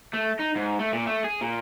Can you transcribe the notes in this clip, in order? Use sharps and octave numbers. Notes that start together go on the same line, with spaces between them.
A3
D#4
G#2
A3
A#2
A3
G#4
A#2